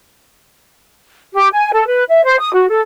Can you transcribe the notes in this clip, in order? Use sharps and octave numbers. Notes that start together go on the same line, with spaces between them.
G4
G#5
A4
B4
E5
C5
D#6
F#4
A4